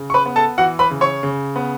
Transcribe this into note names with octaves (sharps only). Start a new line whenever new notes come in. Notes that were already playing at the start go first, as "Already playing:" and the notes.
Already playing: C#3
C#6
B4 B5
B3
A4 A5
E3 F#4 F#5
B4 B5
C#3
C#5 C#6
C#3
B3